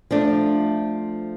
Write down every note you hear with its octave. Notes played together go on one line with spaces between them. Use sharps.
F3 A3 D4